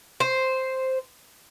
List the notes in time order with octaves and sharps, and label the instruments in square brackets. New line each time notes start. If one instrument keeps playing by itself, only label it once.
[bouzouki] C5